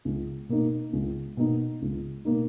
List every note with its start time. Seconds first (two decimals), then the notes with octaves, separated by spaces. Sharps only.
0.05 C#2
0.49 B2 A#3 D#4
0.93 C#2
1.37 B2 A#3 D#4
1.82 C#2
2.25 B2 A#3 D#4